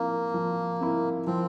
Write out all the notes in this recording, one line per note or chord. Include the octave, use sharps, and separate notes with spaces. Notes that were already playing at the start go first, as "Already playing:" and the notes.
Already playing: F3 A#3 C4 E4 A#4
F3
C4 E4 A#4
F3 C4